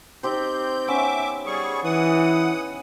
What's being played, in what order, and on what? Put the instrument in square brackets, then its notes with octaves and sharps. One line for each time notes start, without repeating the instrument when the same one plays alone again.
[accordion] C4 G6 [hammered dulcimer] D#4 G4 C5
[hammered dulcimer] B3 C#4 [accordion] E5 D6
[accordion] G3 G#4 C#6
[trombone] E3 [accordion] F#5 D#6